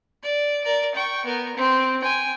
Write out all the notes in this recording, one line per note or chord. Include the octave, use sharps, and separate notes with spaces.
D5
A#4 D5
G5 C#6
B3 A#4
C4
G5 G#5